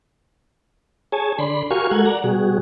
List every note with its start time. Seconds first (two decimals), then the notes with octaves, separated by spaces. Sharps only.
1.12 G#4 C#5 G#5 A5
1.39 D3 D5 B5 C6
1.71 F#4 G4 A#4 F5 G#5 C#6
1.91 G#3 F#4 A4 A#4 F#5 G#6
2.06 D5 F#5 A#5
2.24 B2 G3 F#4 G#4